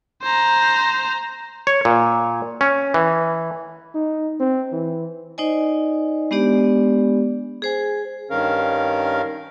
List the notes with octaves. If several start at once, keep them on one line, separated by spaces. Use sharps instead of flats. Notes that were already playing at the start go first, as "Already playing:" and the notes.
C5 A#5
C#5
A#2
C#4
E3
D#4
C4
E3
D#4 C5 D5 D#5 G#5
G#3 B3 D4 G4 D5
G#4 C5 G#5
G2 D#3 C#4 A#4 F5